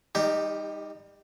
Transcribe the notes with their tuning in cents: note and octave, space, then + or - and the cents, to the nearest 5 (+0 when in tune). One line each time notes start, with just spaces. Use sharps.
G3 +35 D#4 +0 G4 +0